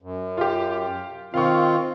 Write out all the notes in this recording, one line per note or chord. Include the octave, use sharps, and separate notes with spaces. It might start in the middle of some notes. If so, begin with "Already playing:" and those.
F#2
F4 G4
D#3 C4 F4 F5 C#6